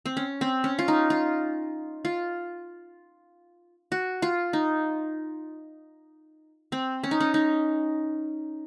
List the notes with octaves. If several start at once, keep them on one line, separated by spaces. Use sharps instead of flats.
C4
C#4
C4
C#4
F4
D#4
F4
F4
F#4
F4
D#4
C4
C#4
D#4
C#4
D#4